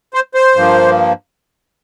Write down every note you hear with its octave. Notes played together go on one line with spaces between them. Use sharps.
C5
C5
G2 F3 A#3